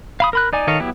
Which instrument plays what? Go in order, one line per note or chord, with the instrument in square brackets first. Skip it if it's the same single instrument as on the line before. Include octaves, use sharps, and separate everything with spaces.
[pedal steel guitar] F5 B5 D#6
A#4 B5 F#6
D#4 D5 G#5
D#3 A4 C#5 D#5 F5
F#3 B3 E4 G4